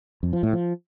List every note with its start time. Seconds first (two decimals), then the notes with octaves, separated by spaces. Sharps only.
0.23 F2
0.33 F3
0.43 A2
0.53 F3